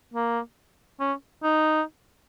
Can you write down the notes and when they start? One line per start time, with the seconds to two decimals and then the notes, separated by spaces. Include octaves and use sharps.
0.14 A#3
1.00 C#4
1.43 D#4